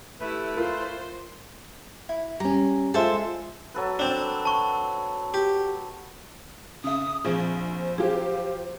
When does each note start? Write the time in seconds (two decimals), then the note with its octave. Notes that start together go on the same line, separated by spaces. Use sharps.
0.20 A3 E4 G4 B4
0.57 F4 A#4 C5
2.09 E4
2.40 G3 C#4 A#5
2.94 G#3 F4 A4 C5 E5
3.74 F#3 A4 B4
3.99 C4 D4
4.45 A5 C#6
5.34 G4
6.84 C#3 E5 D#6
7.25 A#1 F2 F3 G#4 C5
7.98 F#3 F4 G4 G#4